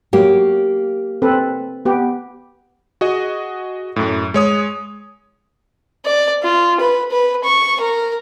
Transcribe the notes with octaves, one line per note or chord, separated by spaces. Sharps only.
F#3 A#3 G4
C4 A4 B4
B3 G4
F#4 G#4 D#5
F#2 A2
G#3 C#5 D#6
D5
F4
B4
B4
C#6
A#4